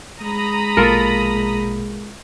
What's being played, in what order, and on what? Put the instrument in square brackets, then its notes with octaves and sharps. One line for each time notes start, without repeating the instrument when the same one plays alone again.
[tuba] G#3 [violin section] A#5 B5 D#6
[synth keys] A#1 B2 A#3 [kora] F4 A4 A#4